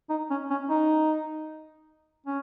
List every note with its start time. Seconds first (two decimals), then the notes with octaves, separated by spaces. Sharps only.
0.10 D#4
0.30 C#4
0.50 C#4
0.70 D#4
2.27 C#4